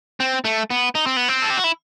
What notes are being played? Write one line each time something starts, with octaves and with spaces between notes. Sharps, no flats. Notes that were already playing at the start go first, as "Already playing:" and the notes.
C4
A3
B3
D#4
C4
B3
C4
A4
G4
F#4
E4